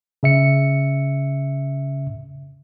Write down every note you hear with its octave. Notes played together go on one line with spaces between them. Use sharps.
C#3 E5 C#7